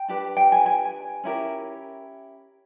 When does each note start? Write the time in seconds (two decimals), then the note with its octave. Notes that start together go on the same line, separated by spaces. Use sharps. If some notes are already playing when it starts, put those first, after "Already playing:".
Already playing: G5
0.08 D4 G4 B4
0.37 G5
0.52 G#5
0.66 G#5
1.24 C#4 E4 G4 A#4